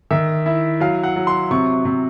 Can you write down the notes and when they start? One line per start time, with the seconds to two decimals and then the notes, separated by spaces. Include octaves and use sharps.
0.11 D#3 E5
0.46 E4
0.80 F#3 F5
1.03 F#5
1.16 F#3
1.27 C6
1.51 C3 C#6
1.85 C3